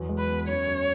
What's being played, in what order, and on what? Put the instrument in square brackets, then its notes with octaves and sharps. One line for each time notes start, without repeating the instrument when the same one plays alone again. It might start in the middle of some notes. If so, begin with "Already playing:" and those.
Already playing: [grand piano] E2 F#3
G#3
[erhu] B4
[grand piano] B3
[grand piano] F#2 [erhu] C#5
[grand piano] F#2